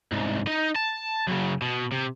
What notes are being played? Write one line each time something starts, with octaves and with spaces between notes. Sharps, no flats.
C2 G#2
D#4 D#5
A5
F#2 C#3
B2
C3